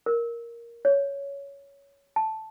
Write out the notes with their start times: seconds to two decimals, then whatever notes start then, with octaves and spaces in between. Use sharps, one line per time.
0.06 A#4
0.85 C#5
2.16 A5